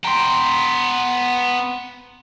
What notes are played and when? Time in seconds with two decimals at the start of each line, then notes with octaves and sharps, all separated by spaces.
0.05 B3 G5 A#5 C6